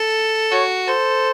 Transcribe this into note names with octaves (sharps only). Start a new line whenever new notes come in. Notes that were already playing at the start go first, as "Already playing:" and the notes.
Already playing: A4
F#4 C#5
A4 C5